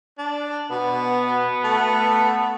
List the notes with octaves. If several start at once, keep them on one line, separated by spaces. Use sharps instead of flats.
D4
B2 B3
A3